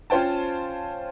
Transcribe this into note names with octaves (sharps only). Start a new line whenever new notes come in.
C#4 F4 C5 G5 A5